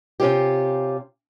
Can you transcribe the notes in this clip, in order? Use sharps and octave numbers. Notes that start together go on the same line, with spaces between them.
C3 C#4 F4 G4